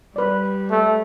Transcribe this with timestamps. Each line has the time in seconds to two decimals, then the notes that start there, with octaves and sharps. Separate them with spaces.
0.16 G3 B4 D5
0.71 A3